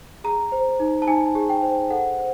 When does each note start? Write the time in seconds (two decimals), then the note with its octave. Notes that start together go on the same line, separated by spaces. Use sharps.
0.24 G#4 A#5
0.52 C5
0.80 D#4
1.02 A5
1.07 D#4 G#5
1.35 G#4
1.49 G5
1.62 C5
1.90 A4 F#5
2.18 C5